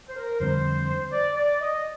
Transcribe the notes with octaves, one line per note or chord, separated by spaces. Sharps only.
C5
A#4
F2 D3 G3 C4 C5
D5
D5
D#5